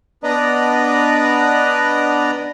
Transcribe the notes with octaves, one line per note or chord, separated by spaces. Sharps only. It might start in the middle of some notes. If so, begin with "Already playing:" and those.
B3 D4 B4 D5 D#5 A#5